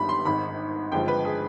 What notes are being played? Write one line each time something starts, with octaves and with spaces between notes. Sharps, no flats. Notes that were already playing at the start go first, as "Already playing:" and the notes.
Already playing: G1 G2 D#3 G3 B5
C6
G#1 G#2 D#3 B5
G#1 G2 D3 F3 G#3 G5
B4
G#4